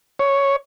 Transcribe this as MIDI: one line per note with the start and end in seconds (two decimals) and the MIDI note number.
0.19 0.56 73